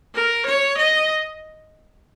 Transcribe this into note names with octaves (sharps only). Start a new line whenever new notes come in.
A#4
C#5
D#5